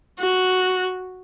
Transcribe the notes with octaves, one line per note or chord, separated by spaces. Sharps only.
F#4